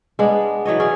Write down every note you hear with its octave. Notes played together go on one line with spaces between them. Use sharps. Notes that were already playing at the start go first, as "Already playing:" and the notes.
G#3 B3 D4
E3 F#3 C#5 D#5
C#4 G#4 D5